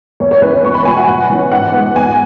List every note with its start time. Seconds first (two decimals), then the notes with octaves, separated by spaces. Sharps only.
0.20 E2 C#5
0.31 C#5
0.42 E3 C#4 B4
0.54 C#5
0.64 E2 C#6
0.74 B5
0.85 B2 F#3 G#5
0.97 F#5
1.08 E2
1.30 E3 C#4
1.52 G#2 F#5
1.73 G#3 B3
1.96 E2 G#5